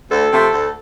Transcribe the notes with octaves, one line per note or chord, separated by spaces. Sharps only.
D2 A4
C3 F3 A3 C4
D2